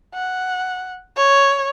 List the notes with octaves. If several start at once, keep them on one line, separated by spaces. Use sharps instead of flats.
F#5
C#5